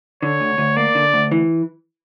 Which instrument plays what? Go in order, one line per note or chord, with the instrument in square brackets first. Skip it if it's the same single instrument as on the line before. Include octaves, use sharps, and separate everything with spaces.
[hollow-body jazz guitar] D3 [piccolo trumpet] C#5
[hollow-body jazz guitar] D2
D2
[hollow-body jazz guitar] A#3 [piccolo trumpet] D5
[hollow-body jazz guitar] D3
D2
E3